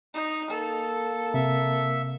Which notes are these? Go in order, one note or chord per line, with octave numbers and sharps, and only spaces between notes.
D#4
A#3 A4
C3 E5